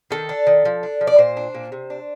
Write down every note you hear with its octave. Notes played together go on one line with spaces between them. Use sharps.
D#3 A4
D4
D#3
F3
D4
F3
D5
A#2 C5
D4
A#2
C3
D4